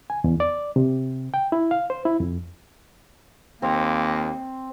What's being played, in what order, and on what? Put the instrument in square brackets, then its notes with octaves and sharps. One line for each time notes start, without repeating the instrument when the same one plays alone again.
[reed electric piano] G#5
E2
D5
C3
G5
E4
F5
C5
E4
F2
[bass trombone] D#2 [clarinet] A#3 [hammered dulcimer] C4